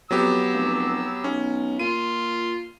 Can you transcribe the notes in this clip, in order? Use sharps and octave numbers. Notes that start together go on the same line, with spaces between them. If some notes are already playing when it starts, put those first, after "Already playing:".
F2 F#3 B3 G4 E6
F1
B1 C#4
A#2 F4 D#7